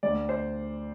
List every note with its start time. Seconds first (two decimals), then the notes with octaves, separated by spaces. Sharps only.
0.03 D2 D5
0.29 C5